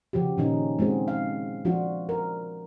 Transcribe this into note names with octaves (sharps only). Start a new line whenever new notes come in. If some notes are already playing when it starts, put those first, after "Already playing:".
C#3 F3 F#4 G4
A#2 D#3 C#4 D#4
G#3 C4 F#4 G#4
F5
F3 D4 F4 F#4
A#4